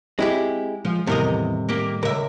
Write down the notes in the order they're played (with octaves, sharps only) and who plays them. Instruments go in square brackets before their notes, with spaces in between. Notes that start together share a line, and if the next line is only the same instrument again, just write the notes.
[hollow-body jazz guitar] G#3 E4 G4 [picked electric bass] C4
[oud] F3 [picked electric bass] G#3
[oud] E2 A#4 D#5 [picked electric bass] A2 D#3 G3 [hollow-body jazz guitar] C3
[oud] A#3 G4
[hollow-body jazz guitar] C#2 [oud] A#4 E5